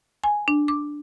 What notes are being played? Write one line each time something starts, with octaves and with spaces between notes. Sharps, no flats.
G#5
D4
D6